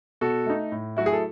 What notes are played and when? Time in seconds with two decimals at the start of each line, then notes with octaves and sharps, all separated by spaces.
0.21 B2 F#4 A4
0.46 A3 D#4
0.72 A2
0.97 F#3 A3 E4 F#4
1.06 G#4
1.13 A4